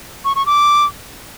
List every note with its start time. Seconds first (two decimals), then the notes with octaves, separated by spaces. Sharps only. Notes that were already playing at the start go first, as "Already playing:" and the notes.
0.25 C#6
0.36 C#6
0.46 D6